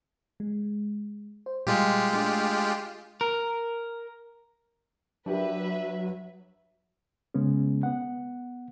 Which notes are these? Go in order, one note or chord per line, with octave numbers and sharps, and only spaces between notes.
G#3
C5
A#2 G3 G#3 F4 G4
A3 D4
A#4
F#3 D4 G4 A#4 B4 E5
C#3 G#3 B3 C#4
B3 F#5